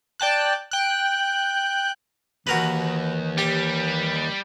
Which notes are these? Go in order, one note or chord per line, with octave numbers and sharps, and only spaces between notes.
D5 G5 A5 F#6
G5 F#6
D#2 E3 F#4 A#4 B4
G3 G4